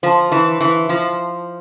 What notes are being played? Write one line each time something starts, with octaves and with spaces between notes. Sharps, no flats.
F3 C5 F5 A5 C6
E3
E3
F3